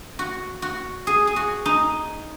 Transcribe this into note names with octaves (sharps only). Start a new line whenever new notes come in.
F#4
F#4
G#4
G#4
F#4
D#4